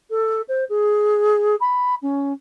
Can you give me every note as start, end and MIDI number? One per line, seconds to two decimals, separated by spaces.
0.10 0.41 69
0.48 0.64 72
0.69 1.55 68
1.60 1.94 83
2.02 2.32 61